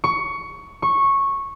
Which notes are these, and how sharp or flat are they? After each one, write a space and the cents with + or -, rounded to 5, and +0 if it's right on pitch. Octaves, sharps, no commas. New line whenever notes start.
C#6 +15
C#6 -10